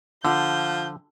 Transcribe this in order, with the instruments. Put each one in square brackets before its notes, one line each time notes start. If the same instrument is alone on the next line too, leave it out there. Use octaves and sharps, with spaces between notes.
[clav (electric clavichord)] D3 [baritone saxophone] F3 [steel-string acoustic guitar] F4 F#5 [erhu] G6